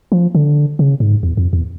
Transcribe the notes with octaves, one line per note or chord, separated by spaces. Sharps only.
F3
D3
C#3
G#2
E2
F2
E2